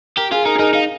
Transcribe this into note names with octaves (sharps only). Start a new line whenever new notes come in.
G4 A#4
F4 G#4
D#4 A#4
G#4
D#4 A#4
D#4 F5